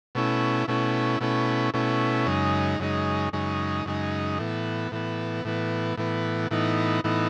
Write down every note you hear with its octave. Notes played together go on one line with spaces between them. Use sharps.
B2 A3 C#4 E4
B2 A3 C#4 E4
B2 A3 C#4 E4
B2 A3 C#4 E4
F#2 C#3 G#3 D#4
F#2 C#3 G#3 D#4
F#2 C#3 G#3 D#4
F#2 C#3 G#3 D#4
A2 E3 B3
A2 E3 B3
A2 E3 B3
A2 E3 B3
A2 E3 B3 D#4
A2 E3 B3 D#4